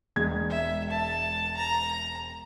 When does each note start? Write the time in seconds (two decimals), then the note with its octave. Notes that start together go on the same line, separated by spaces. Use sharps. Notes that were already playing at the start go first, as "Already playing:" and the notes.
0.16 E1 G#3 G#6
0.50 E5
0.90 A5
1.57 A#5